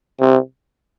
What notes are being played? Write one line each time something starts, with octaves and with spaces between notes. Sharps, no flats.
C3